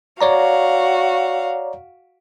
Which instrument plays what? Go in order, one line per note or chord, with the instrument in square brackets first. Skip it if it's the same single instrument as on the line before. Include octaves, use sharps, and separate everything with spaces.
[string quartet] F#4 F5 [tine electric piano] C#5 D5 A#5